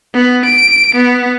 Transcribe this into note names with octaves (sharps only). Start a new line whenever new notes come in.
B3
D7
B3